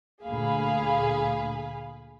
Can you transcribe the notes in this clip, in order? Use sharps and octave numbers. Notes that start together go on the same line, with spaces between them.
D2 A#2 A#3 G#4 F5 B5